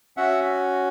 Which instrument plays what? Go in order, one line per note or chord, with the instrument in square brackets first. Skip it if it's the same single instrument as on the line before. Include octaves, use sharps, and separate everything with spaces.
[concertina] C#4 F#4 E5 F#5